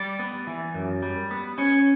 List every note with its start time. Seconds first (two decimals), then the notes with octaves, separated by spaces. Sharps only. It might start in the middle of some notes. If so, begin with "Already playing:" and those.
Already playing: G3 D5
0.19 B3
0.47 E3
0.74 F#2
1.02 G3
1.31 B3
1.58 C#4 C#5